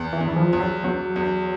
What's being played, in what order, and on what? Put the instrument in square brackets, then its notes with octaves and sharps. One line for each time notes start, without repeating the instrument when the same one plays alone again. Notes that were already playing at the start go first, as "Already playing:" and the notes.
Already playing: [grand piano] E2
[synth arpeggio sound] E3
[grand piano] E2
[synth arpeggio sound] E3
F3
[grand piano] E2
[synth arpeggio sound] F#3
[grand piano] E2 [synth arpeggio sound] F#3
[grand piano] E2